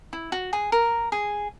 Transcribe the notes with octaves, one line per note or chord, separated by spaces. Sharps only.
E4
F#4
G#4
A#4
G#4